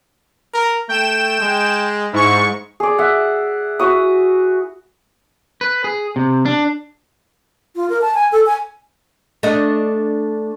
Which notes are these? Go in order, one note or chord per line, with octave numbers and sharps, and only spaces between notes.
A#4
A3 G5 E7
G#3
G#2 E4 C#6
G#4 D5
E5 F#5
E4 F#4 D#6
B4
G#4
C3
D4
F4
A#4
A5
G#5
A4
G#5
A3 D4 D#5